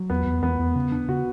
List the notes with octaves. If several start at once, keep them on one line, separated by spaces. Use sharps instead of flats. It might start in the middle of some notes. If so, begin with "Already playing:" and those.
Already playing: F#3
E2 B3
E2
E2 B3
E2
C#3
D4
C#3 F#4